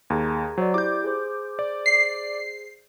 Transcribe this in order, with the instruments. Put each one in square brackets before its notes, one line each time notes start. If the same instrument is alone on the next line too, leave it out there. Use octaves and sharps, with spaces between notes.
[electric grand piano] D#2 [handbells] G#4 A#5 G#6
[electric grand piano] F#3 [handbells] C5 D5
[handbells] E4 G4 [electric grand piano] D6 G6
[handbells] G#4 C5
[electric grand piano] D5
[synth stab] C7